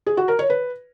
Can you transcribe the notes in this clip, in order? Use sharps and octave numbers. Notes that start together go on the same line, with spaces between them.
G#4
F#4
A#4
C#5
B4